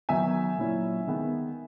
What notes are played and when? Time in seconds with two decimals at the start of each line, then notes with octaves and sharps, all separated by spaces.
0.09 D#3 F#3 B3 D#4 E5 G#5
0.58 A#2 F#3 C#4 E4
1.07 D#3 G#3 B3